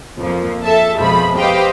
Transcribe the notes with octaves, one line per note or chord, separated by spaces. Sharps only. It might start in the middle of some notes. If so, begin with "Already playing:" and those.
F2 F3 A#3
A4 E5 A5
F2 B2 F3 G#3 B5
G4 B4 C5 D#5 F5 G5